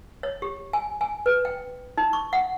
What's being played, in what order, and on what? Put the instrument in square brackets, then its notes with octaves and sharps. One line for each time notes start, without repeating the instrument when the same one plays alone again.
[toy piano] C#5
G4
G#5
G#5
B4
G5
D#4
C#6
F#5